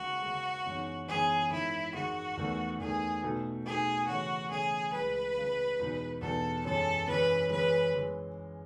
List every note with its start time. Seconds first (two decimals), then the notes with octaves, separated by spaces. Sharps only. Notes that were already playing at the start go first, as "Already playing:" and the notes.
Already playing: D#2 C#3 G#3 F#4
0.23 D#2 C#3 G#3
0.66 F#2 E3 G#3 B3 D#4
1.08 F#2 E3 G#3 B3 D#4 G#4
1.51 G#2 D#3 G#3 E4
1.94 G#2 D#3 G#3 F#4
2.37 E2 D#3 A3
2.79 E2 D#3 A3 G#4
3.23 B2 A3 D#4
3.65 B2 A3 D#4 G#4
4.07 C#3 E3 A3 C#4 F#4
4.50 C#3 E3 A3 C#4 G#4
4.93 C#2 C#3 G#3 B4
5.36 C#2 C#3 G#3
5.80 E2 B2 G#3 D#4
6.21 E2 B2 G#3 D#4 A4
6.65 F#2 E3 G#3 C#4 A4
7.07 F#2 E3 G#3 C#4 B4
7.50 F#2 E3 G#3 B4
7.94 E3 G#3